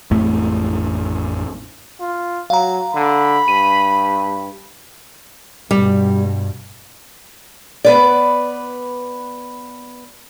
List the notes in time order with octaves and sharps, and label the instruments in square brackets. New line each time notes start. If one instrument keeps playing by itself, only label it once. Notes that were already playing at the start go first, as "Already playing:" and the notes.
[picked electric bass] A1 F2 A2 A3
[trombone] F4
[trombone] F#3 [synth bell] F5 A#5
[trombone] D3 [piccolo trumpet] B5
[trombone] G2 [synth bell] D#7
[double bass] G2 B2 [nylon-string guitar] G3
[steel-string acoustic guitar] B3 B4 D5